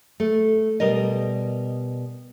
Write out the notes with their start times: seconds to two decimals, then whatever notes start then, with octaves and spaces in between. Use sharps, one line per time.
0.20 A3
0.80 B2 G3 A#4 D#5